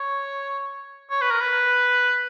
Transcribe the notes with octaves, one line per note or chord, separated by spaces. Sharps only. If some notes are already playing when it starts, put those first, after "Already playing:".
Already playing: C#5
C#5
B4
A#4
B4